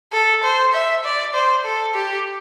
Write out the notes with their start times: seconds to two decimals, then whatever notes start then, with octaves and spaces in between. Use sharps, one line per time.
0.13 A4
0.44 C5
0.73 E5
1.04 D5
1.34 C5
1.65 A4
1.94 G4